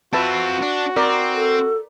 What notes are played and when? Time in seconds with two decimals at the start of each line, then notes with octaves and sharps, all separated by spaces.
0.13 C4 F4 F#4 B4 E5 A5
0.62 D4
0.97 C4 A#4 D5
1.35 A4